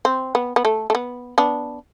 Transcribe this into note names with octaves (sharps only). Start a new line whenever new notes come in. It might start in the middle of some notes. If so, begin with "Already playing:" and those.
C4
B3
B3
A3
A3
B3
B3 D4